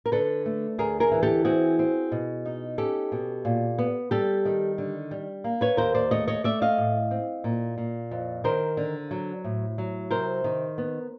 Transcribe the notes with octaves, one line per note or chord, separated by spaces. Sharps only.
A#4
D3 A4 B4
A3
D2 G#4 A#4
G#4 A#4
E3
G4 A4
C4 F#4 G#4
C4
B2
D#4
C#4 G4 A4
B2
A#2
B3
G3 G4 A4
D#3
D3
G3
A#3
B4 C#5
D#2 A#4 C5
C5 D5
A3 C#5 D#5
C#5 D#5
A3 D5 E5
D#5 F5
A2
C4
A#2
A#2
F2
D#3 A#4 C5
D3
F#3
A2
F#3
C3 A#4 C5
D#3
B3